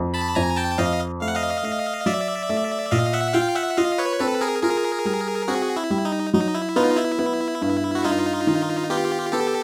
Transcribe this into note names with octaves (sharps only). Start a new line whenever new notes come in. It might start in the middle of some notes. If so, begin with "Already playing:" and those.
Already playing: F2
A5 B5
F2 G#5 A#5
G5 A5
F2 D#5 F5
A3 F5
F#5
D#5 F5
A3
F#3 D5 E5
A3
A#2 D#5 F5
E5 F#5
F4 F5 G5
E5 F#5
F4 D#5 F5
B4 C#5
C4 A4 B4
G#4 A#4
F4 G#4 A#4
G3
C4 F#4 G#4
E4
G3
D#4
F#3 D#4
E4
B3 D#4 F4
E4
B3
G2
F#4
G2 D#4 F4
D#3
B3 F4 G4
B3 G4 A4